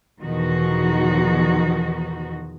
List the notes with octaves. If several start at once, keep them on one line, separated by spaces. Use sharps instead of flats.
E2 B2 D#3 F3 D#4 F#4